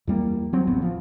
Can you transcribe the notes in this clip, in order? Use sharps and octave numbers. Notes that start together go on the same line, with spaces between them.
E2 G3 A#3
F#3 C4
D1 A1 F2 B3
F3